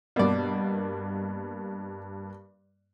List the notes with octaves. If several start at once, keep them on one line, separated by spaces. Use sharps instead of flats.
G2 B2 A#3 D5